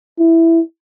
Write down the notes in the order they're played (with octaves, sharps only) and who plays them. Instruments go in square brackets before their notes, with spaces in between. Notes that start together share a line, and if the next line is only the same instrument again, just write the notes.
[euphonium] E4